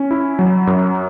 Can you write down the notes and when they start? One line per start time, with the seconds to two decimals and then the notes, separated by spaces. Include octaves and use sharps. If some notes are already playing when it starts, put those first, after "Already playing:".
Already playing: C#4
0.11 E4
0.39 F#3
0.67 F#2